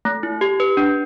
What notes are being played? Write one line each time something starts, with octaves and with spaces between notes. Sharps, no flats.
A3
E4
G4
B4
D4